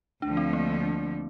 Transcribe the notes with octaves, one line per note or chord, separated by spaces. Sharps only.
D2 D3 F3 D4
C4
A#3